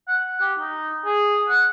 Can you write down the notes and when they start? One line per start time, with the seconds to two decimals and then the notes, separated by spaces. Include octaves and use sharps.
0.08 F#5
0.41 G4
0.59 D#4
1.06 G#4
1.49 F#5